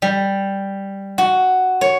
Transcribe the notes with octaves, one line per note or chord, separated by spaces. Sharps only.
G3
F#4
C#5